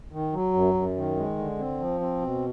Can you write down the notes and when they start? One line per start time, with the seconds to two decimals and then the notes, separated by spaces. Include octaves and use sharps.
0.12 D#3
0.33 F#3
0.54 F#2
0.74 F#2
0.96 D#3
1.16 G#3
1.38 D3
1.58 C4
1.79 F3
2.00 C4
2.21 B2